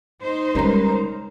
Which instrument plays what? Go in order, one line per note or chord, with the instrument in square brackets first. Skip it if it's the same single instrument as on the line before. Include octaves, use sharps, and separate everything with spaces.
[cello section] D#4 C5
[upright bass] C#3 G#3 [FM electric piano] G3 C#4 A#5 [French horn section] A#4